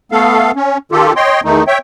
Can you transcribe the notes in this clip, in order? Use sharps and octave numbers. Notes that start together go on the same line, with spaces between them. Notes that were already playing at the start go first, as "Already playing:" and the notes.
A3 B3 A4 F5
C#4
D#3 F4 G4 A4
C#5 D#5 G5 C6
E2 D#3 A3 D#4
C#5 E5 G5